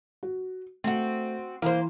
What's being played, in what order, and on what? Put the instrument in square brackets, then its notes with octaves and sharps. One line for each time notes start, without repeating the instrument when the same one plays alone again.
[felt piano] F#4
[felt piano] A3 [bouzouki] C4 F#4
[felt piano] E3 [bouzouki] A#3 C5